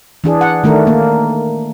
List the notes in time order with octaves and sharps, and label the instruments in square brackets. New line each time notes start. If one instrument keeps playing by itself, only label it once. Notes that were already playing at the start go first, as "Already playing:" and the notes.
[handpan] E3 D4 G#4
F#5
D#3 A3 D4 A#4
A#3